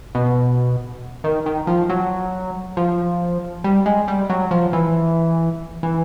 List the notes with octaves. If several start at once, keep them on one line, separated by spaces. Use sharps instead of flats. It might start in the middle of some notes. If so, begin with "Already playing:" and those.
B2
D#3
D#3
F3
F#3
F3
G3
G#3
G3
F#3
F3
E3
E3